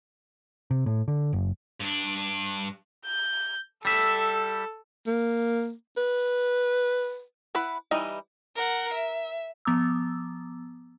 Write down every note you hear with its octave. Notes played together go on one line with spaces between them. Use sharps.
C3
A2
D3
F#1
G2 D4
G6
G3 A4 E5
A#3
B4
E4 B4 F#5 B5
E3 G3 D#4 D#5
A#4 F#5
E5
F3 B3 A#5 D6 E6